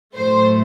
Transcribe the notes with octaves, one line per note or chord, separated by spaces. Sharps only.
A2 F#3 A3 C5